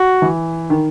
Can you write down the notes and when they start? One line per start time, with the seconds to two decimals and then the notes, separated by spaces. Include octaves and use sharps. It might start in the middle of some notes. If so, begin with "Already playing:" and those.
Already playing: F#4
0.22 E3
0.70 D#3